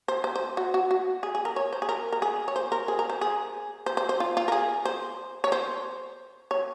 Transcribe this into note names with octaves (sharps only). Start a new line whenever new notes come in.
C5
C5
C5
F#4
F#4
F#4
G#4
G#4
A#4
C#5
C5
G#4
A#4
A#4
G#4
C#5
C5
A#4
G#4
A#4
C5
G#4
C5
C5
C5
F4
F4
A#4
G#4
C5
C#5
C5
C#5